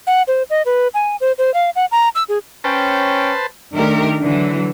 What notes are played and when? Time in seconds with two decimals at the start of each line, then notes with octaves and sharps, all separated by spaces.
0.07 F#5
0.28 C5
0.50 D#5
0.66 B4
0.94 G#5
1.21 C5
1.38 C5
1.54 F5
1.76 F#5
1.92 A#5
2.15 E6
2.29 G#4
2.64 C#4 B4 C5 G5 A5
3.74 D#3 A3 D4 G4 A#4
4.21 D3 E3 F#3